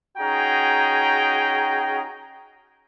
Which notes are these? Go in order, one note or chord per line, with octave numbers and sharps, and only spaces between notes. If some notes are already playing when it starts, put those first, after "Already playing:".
C#4 D#4 F#4 G#4 G5 A#5